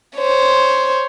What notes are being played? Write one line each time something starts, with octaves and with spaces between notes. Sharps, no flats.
C5 C#5